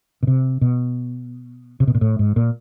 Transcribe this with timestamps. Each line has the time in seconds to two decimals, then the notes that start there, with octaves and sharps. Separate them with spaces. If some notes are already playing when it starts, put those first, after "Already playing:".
0.23 B2
0.27 C3
0.61 B2
1.80 C3
1.87 B2
1.95 A#2
2.01 A2
2.19 G#2
2.36 A#2